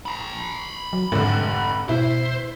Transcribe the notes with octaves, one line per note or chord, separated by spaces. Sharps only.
A#5 B5
F#3
F1 G#2 D3
B2 E4 C5